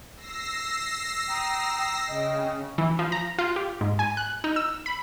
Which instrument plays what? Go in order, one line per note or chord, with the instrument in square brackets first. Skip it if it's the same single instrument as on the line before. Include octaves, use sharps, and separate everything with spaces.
[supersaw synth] E6 A#6 C7
[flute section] G5 A#5 D#6
[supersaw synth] C#3 [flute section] D#5 G5 D#6
[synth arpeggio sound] E3
F3
A#5
F4
G4
G#2
G#5
F#6
D#4
E6
B5